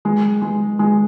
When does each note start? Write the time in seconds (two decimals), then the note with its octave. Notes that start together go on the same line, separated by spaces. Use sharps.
0.05 G#3
0.42 G#3
0.79 G#3